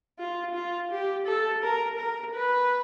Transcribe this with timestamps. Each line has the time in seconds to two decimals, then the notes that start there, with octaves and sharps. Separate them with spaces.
0.19 F4
0.54 F4
0.91 G4
1.26 A4
1.63 A#4
1.99 A#4
2.35 B4